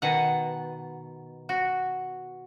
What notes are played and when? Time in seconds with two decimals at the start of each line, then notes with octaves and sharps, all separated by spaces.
0.02 B2 D#3 F#5
1.49 F#4